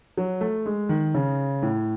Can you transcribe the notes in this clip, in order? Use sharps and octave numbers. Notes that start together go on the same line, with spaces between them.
F#3
A3
G#3
D#3
C#3
A2